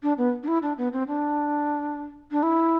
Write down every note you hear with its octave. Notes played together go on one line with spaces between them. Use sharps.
D4
B3
D4
E4
D4
B3
C4
D4
D4
E4